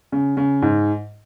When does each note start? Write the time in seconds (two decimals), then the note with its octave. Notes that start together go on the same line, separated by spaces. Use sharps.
0.12 C#3
0.37 C#3
0.62 G#2